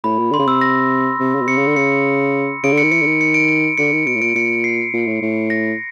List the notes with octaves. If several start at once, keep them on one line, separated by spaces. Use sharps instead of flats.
A2 B5
A#2
D3 C6
C#3
C3 E6
A#6
C3
C#3
B2
C3 C#7
C#3
D3
C#3 C#7
C#3 D7
D3
C#7
D#3
E3 C#7
D3
D#3
C#7
D7
D7
D3 C#7
D#3
B2 D7
A2
A#2 D7
A#2 C#7
C7
A#2
A2
A2
A#6